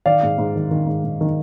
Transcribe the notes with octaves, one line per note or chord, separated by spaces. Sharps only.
D#3 D5 F5
G#2
G#2
D#3
D#3
G#2
G#2
D#3